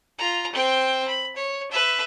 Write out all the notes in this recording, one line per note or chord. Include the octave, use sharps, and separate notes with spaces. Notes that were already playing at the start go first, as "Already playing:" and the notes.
F4 A#5
C4 G5
B5
C#5
B4 E5